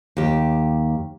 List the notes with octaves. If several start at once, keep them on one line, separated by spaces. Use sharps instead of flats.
D#2 G4